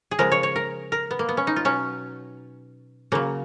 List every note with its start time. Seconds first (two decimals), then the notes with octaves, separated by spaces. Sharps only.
0.11 G#4
0.19 C#3 F3 G#3 A#4
0.32 C#5
0.43 C#5
0.56 A#4
0.92 A#4
1.11 B3
1.19 A#3
1.29 B3
1.37 C#4
1.47 D#4
1.56 F4
1.65 B2 F#3 C#4
3.12 C#3 F#3 A#3